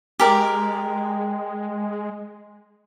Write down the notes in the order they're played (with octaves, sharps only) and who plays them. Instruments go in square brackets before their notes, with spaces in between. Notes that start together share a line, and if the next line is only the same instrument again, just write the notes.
[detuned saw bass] G#3 [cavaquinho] G4 A#4 D5